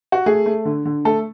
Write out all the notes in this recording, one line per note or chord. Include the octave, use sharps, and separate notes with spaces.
F#4
A3 G#4
A3
D3
D3
A3 A4